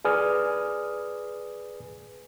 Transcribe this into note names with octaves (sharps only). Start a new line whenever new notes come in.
G#4 B4 D5 G#5 D#6 F6